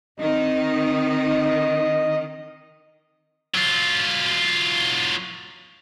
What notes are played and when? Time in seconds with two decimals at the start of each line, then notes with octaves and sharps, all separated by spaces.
0.20 D#3 C4 D#4 D#5
3.55 F#3 F4